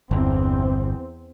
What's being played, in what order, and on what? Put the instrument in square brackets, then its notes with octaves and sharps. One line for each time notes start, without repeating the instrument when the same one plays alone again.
[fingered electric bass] G1 [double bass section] E2 C4